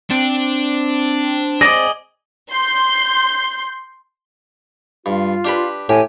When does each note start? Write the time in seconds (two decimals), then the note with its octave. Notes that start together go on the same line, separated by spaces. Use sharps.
0.11 C4 D4
1.61 G#4 D5 D#5 A#6
2.51 C6 G6
5.06 G2 F4
5.45 D4 G4 B4
5.89 A2 G4 G#5